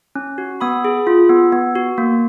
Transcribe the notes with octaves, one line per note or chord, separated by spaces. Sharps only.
C#4
F#4
B3 B5 D#6
G#4
F4
B3
B3
F#4
A#3